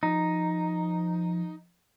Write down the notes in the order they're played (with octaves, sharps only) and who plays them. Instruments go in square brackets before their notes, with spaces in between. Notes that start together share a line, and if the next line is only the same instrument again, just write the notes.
[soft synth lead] F3 [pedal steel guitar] D#4